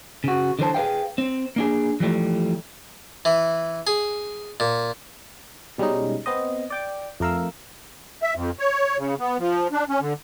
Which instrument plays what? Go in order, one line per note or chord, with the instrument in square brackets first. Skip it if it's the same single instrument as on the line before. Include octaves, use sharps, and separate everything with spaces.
[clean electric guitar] C#3 F#4
D3 E3 C5 A5
G#4 B4 D#5 F5 G5
C4
A#3 D4 G#4
E3 F3 G3 A3
[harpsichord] E3
G#4
A#2
[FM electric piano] B2 G3 G#3 C#4 D#4
B3 C4 C5 D#5
D5 G5 D6
F2 A3 A#4 F5 E6
[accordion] E5
F2
C#5
C#3
B3
F3
D4
C#4
D3